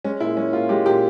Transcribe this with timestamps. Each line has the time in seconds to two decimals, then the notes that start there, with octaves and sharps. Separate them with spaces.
0.04 G#3 C#4
0.20 A#2 E4
0.37 G#3 C#4
0.53 A#2 F4
0.69 G#3 G4
0.86 A#2 G4